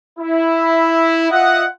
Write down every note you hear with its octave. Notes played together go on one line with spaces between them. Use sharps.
E4
F4 D#5 E5 F#5